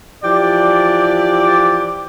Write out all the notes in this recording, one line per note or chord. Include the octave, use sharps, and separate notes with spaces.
E3 F3 G4 D5